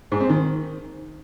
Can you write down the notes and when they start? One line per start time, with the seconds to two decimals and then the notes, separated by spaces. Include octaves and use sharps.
0.12 G#2
0.21 C4
0.29 D#3